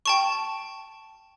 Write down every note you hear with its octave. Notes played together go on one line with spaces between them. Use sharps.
G5 A5 C#6